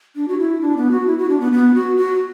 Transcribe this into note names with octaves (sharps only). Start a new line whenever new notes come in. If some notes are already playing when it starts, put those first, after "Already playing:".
D4
F#4
E4
D4
B3
F#4
E4
F#4
D4
B3
B3
F#4
F#4